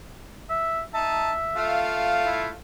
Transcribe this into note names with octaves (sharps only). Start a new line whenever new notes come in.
E5
D#4 E5 A5
A3 F4 F5
E4